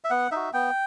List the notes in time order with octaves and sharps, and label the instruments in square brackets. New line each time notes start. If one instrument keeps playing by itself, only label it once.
[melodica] E5
B3 F#5
D#4 F#4 E5
B3 G5